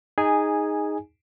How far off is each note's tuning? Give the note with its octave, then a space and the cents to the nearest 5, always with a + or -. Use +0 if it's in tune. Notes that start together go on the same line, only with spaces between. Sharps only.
D#4 +0 G#4 -10 G#5 +0